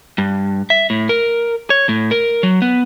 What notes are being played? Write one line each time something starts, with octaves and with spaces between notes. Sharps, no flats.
G2
E5
A2
A#4
C#5
A2
A#4
F#3
B3